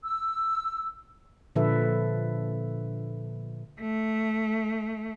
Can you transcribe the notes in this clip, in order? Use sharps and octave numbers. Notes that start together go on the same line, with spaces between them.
E6
A#2 D3 F3 A4 B4 E5
A3